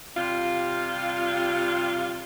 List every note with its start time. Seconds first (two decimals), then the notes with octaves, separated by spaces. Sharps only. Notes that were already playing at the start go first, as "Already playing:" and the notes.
0.15 C3 G3 F4